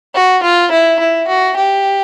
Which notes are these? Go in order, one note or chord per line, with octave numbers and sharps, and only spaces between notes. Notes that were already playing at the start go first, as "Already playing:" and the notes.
F#4
F4
E4
E4
F#4
G4